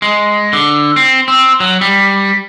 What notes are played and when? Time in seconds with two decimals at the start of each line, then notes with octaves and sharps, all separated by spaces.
0.02 G#3
0.53 D3
0.96 C4
1.28 C4
1.60 F#3
1.81 G3